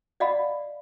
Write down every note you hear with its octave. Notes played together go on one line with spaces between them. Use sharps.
D5 D#5 F5 F#5 B5